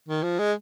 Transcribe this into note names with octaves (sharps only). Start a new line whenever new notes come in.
D#3
F3
G#3